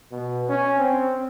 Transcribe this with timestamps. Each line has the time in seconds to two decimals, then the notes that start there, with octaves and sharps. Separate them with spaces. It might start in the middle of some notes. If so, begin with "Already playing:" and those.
0.12 B2
0.49 C#4
0.78 C4